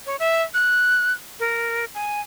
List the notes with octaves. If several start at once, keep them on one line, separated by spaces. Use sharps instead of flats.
C#5
E5
F#6
A#4
G#5